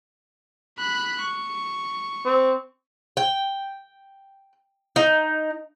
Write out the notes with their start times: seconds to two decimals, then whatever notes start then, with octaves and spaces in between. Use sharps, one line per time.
0.79 B5 F#6
1.22 C#6
2.26 C4
3.17 G5
4.96 D#4